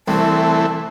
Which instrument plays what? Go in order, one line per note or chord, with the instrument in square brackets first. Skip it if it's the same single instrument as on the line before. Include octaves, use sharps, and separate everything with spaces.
[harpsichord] C2 [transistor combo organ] E3 A3 C4 [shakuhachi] A5